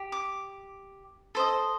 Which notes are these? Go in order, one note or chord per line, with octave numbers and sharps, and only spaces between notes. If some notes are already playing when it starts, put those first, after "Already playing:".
Already playing: G4
D6
A4 C5 D#5